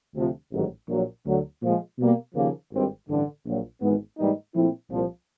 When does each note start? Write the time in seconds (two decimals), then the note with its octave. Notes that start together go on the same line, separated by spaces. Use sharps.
0.15 D2 C3 F3
0.52 A1 G#2 D#3 F#3
0.88 A#1 A#2 F#3
1.25 D2 D3 F#3
1.62 A#2 F3 G#3
1.98 B2 G3 A#3
2.35 D#2 C#3 F3 A#3
2.71 G#1 G2 D#3 G3 C4
3.09 A1 G2 D3
3.45 A#1 A#2 F#3
3.81 G#1 G#2 E3 G#3 B3
4.17 G#2 E3 G3 A#3 D#4
4.54 A#2 F3 A3 C4 E4
4.90 C2 A#2 F3